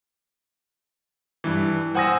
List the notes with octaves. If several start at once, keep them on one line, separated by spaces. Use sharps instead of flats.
G2 E3
C5 F#5 G#5 D#6 E6 A#6